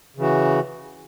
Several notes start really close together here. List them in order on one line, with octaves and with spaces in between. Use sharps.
C#3 E3 F#4